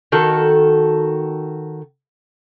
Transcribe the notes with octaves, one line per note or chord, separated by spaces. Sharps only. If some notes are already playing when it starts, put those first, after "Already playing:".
D#3 F#4 A4